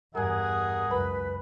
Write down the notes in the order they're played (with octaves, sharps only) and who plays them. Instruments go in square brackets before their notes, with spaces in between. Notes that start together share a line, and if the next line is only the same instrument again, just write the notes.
[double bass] E2 G2 [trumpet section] G#4 D#5 F#5 [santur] A#4 G#5
[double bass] C#2 F#2 [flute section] B4 [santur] B5